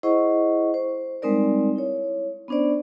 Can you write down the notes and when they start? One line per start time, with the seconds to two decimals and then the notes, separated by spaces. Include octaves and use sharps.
0.03 E4 G#4 C5 D#5 F#5 C#6
0.74 C5
1.22 G3 G#3 C4 D#4 A#4 D5
1.76 E4 C#5
2.48 B3 C#4 D4 C5 D5